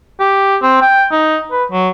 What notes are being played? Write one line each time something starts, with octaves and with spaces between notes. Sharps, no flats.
G4
C4
G5
D#4
B4
F#3